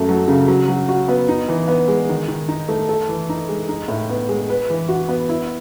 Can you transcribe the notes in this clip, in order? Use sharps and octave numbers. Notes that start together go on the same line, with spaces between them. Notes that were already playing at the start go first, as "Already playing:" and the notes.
Already playing: F#2 A3
F#3
C#3
F#3
F#3
F#4
B3
D#4
E3
B3
G#3
D#3
D#3
D#4
A3
A4
E3
D#4
G#3
D#4
A2
B3
G#3
B4
E3
F#4
B3
E4